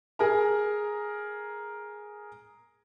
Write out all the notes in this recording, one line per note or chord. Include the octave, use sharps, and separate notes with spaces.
G#4 A#4 A#5